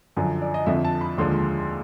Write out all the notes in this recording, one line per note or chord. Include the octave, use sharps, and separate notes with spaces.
F#2 D3 F3
D5
D#5
F2 D3 F3 E5
A5
B5
D#2 D3 F3 G#3 C6